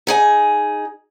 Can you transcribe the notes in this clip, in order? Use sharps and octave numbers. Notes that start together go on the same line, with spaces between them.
D#4 G#4 G#5